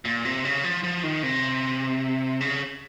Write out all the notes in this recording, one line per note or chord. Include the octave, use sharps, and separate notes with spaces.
A#2
C3
C#3
F3
F3
D#3
C3
C#3